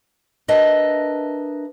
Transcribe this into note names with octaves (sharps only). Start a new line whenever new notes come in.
D4 A#4 B4 D#5 E5